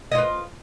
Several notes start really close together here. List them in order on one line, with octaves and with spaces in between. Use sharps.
D#5 F4 B4